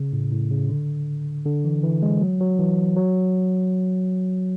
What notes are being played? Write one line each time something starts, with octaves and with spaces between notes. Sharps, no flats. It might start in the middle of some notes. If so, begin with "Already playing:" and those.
Already playing: C#3
A2
A2
C#3
D3
D3
E3
E3
G#3
F#3
F#3
E3
F#3